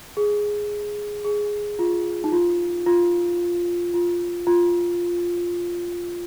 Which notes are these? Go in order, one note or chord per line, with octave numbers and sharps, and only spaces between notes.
G#4
G#4
F4
D#4
F4
F4
F4
F4